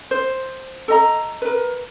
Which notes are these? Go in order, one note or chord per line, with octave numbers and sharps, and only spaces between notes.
C5
A4 D#5 A#5
A#4 B4